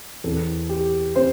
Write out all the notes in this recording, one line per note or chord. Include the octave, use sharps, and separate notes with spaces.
E2 E3 C4 A4
G4
C4 C5